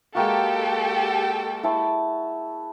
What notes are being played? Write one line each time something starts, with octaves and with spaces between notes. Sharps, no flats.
G#3 A#3 F#4 G4 A4 G5
E4 A5 C#6